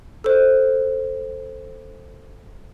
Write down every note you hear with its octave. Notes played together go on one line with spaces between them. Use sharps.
A4 C5